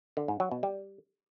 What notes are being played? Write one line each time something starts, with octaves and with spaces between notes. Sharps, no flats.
D3
G#2
F#3
B2
G3